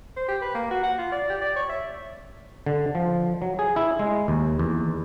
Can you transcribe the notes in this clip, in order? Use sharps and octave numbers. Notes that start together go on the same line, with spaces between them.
C5
G4
B4
A#3
F#4
F#5
F4
D5
G4
D5
C#5
E5
D3
F3
F#3
G#4
E4
G#3
D#2
E2